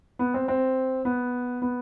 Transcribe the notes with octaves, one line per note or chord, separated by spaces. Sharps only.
B3
C4
C4
B3
B3